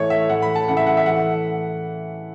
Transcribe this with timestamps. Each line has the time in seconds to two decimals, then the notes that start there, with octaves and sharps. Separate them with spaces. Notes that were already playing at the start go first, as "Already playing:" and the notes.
Already playing: A2 E3 A3 C#5
0.10 E5
0.29 A2 E3 A3 F#5
0.42 B5
0.55 A5
0.68 C#3 E3 A3 F#5
0.77 E5
0.87 F#5
0.97 E5
1.06 A2 E3 A3 F#5